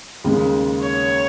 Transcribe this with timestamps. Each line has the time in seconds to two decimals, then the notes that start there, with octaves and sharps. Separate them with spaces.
0.24 D#2 C#3 G#3
0.82 C#5